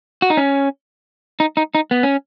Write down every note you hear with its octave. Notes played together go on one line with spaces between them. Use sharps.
F#4
D#4
C#4
D#4
D#4
D#4
B3
C#4